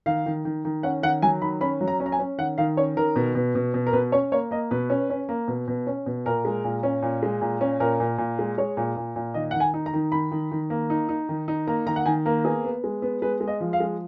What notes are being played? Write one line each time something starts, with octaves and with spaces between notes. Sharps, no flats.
D#3 F5
D#3
D#3
D#3
C#4 F#5
D#3 F#5
F#3 G#5
D#3 B5
C#4 B5
F#3
A#5
C#4
A#5
G#5
C#4
D#3 F#5
D#3 F5
C#4 C#5
D#3 A#4
B2
B2
B2
B2
A#4
B2 B4
C#4 C#5
A#3 C#5
A#3 D#5
B2 B4
C#4
C#4
A#3
B2
B2
C#4
B2
A#2 A#4
G#3
A#2
C#4
A#2
G#3
A#2
C#4
A#2 A#4
A#2
A#2
G#3
G#3 C#5
A#2
A#2
A#2
D#3 D#5
D#3 F#5
G#5
D#4
A#5
D#3
D#3 B5
D#3
D#3
A#3
D#4
D#4
D#3
D#4
A#3 A#5
D#3 A#5
F#5
D#3 G#5
A#3 A#4
B3 G#4
B3
G#3
B3
G#3 B4
G#3
D#5
F3
F5
G#3